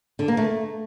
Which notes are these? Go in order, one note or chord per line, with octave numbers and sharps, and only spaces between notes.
D3
A#3
A3